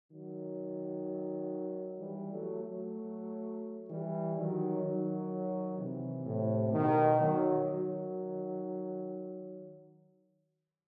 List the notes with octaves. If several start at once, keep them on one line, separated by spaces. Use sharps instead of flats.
D#3 F#3
E3 G3
F#3 A3
F#3 A3
E3 G3
D#3 F#3
D#3 F#3
C3 E3
A2 C3
B2 D#3
D#3 F#3
D#3 F#3